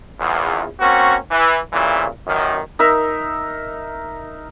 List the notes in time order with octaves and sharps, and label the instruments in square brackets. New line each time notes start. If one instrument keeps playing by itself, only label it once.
[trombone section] A#1 E2
A#3 C4 C#4 F#4
E3
C2 A#2 C#3 E3
A1 F#2 D#3
[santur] D#4 A#4 E5